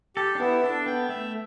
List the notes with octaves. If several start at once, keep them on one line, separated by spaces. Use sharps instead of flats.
G4 A4
D4
B3 E4
D4 A4
B3 G5
A3 E5